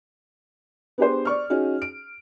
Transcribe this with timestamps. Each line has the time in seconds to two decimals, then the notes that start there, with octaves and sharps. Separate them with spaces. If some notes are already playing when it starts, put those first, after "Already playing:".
0.98 B3 D4 G4 G#4 B4 C5
1.25 D5 C#6 F6
1.50 C#4 D#4 F#4 G#4
1.82 D7